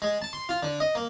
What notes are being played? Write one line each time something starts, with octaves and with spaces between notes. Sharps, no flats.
G#3
A5
C6
F4
D3
D#5
A#3